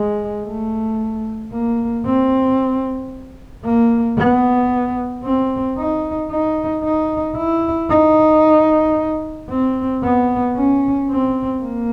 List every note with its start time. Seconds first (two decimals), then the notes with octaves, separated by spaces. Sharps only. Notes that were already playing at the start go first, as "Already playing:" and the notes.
Already playing: G#3
0.45 A3
1.52 A#3
2.05 C4
3.64 A#3
4.17 B3
5.24 C4
5.78 D#4
6.31 D#4
6.84 D#4
7.37 E4
7.90 D#4
9.49 C4
10.03 B3
10.56 C#4
11.09 C4
11.62 A#3